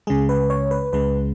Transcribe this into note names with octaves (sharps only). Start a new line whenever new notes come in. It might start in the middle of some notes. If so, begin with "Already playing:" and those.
C#2 C#3 G#3 G#4
B4
C#5
B4
C#2 C#3 G#3 B4